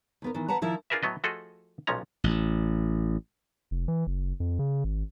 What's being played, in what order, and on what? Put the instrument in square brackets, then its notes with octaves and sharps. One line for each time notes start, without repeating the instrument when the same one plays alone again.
[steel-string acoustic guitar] D#2 B3 A#4
D#3 E3
E3 B4 F#5 A5 A#5
D#3 F3 E4 A#4 E5
[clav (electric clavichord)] D4 F4 G#4 A#4 B4 E5
A2 F#3 B3 D#5
F3 A3 F#4 G#4 A4 D#5
B1 A#2 F3 G#3 C#4 A#5
[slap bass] A1
[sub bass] F1
E3
F#1
F2
C#3
G#1